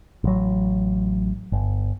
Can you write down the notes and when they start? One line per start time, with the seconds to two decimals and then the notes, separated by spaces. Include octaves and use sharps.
0.24 A1 F#3
1.52 G1